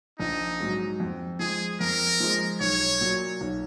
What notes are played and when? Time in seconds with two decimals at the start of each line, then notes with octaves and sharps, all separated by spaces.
0.20 A#1 D#4
0.60 G#2 F#3
1.00 F2
1.39 F3 G#3 G#4
1.80 F2 A#4
2.20 F3 G#3
2.60 B1 C#5
3.01 A#2 F#3
3.41 B1